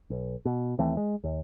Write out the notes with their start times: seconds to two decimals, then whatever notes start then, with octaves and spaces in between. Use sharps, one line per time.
0.10 B1
0.45 B2
0.79 D#2 E3 A3 C4
0.97 G#3
1.24 D#2